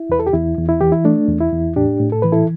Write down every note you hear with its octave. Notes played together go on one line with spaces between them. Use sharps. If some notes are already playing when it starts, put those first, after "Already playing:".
Already playing: E4
E2 B4
A4
G4
E2 E4
E2
E4
E3 G4
E4
A3 D4
E2
E4
E2
A2 D4 G4
A2
A4
E3 B4
E4 A4